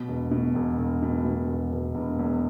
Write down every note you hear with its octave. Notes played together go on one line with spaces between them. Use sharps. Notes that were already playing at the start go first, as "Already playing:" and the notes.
Already playing: B2
E1
B2
E1
E1
B2
B2
E1
E1
E1
E2